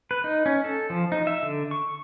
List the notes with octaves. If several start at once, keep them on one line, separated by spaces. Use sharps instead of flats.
B4
D#4
C#4
A4
F3
D#4
E5
D3
C#6